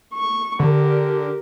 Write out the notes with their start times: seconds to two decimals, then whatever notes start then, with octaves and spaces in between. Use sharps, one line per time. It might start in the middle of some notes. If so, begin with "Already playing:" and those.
0.14 C#6
0.59 D3 G4 A#4